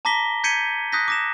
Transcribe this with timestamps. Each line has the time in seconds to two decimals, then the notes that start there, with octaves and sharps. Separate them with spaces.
0.05 A5 A#5 D6 A#6 B6 G7
0.44 G6 G#6 B6 C#7 D#7 G7
0.92 D#6 F#6 G6 A#6 B6
1.08 D6 A#6 E7